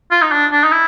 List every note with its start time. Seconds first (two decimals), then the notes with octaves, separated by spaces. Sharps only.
0.11 F4
0.22 D#4
0.32 D4
0.52 D4
0.64 D#4
0.72 E4